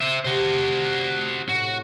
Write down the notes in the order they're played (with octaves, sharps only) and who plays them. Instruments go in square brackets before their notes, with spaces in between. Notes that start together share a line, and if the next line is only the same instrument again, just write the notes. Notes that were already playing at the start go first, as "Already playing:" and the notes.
[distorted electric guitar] C5 E5
[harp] C3 [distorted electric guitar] F#4 C5
[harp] A2 [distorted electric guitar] F#4